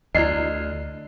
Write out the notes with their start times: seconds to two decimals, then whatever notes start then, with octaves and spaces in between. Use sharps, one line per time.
0.15 D2 E4 D5 D#5 C7